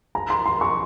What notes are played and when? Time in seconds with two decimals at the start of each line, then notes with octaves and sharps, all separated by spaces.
0.15 A#5
0.30 C6
0.46 C6
0.61 C#6